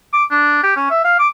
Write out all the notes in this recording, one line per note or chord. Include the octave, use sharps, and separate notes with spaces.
D6
D4
G4
C#4
E5
F5
D6